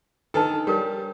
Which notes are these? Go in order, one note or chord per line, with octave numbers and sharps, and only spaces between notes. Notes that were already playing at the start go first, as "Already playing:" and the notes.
D#3 D4 A4 B4 A5
G3 G4 A#4 C#5